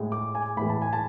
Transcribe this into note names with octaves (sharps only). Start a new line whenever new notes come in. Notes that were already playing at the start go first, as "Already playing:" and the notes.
Already playing: A2 G#3
D6
G#5
A2 E3 G#3 B5
A5
G#5
A5